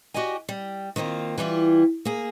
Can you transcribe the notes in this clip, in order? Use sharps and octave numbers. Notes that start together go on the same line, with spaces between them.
F#4 G4 D5 D#5 G#5
G3
D#3 A#3 C4 F4
E3 G3 E4 F4
A#3 G#4